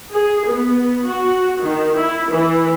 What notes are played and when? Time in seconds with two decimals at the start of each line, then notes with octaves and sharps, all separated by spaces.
0.14 G#4
0.49 B3
1.08 F#4
1.62 D#3
1.98 E4
2.30 E3